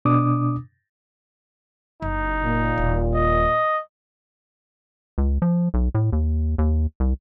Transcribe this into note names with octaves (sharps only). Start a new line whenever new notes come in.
B2 D4 D6 D#6
F#1 D#4
A#2
D#1
D#5
C#2
F3
B1
A2
D#2
D#2
C2